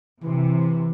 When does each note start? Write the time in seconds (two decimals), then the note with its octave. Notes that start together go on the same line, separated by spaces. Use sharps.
0.23 C3 E3